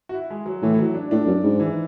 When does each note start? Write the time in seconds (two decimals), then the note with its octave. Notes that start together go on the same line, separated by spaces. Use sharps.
0.09 F#4
0.14 E4
0.30 G#3
0.46 F#3
0.63 A2 E3
0.74 E3
0.79 F#3
0.95 D4
1.11 A2 D4
1.27 F#2
1.43 G#2
1.60 E3